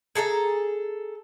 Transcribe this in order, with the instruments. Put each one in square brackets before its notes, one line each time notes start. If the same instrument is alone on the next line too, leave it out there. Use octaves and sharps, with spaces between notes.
[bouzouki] G#4 A4 D5 A#5